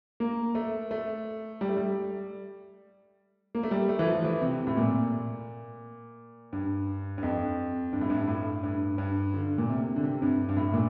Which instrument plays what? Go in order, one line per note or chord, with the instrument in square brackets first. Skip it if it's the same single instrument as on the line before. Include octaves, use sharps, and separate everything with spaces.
[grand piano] A#3
A3
A3
G3
A3
G3
A#3
A3
G3
A3
E3
F3
E3
C3
A2
A#2
G2
G2
F2
G2
A2
G2
A2
G2
G2
D3
A#2
C3
D3
C3
G2
G2
A2
A#2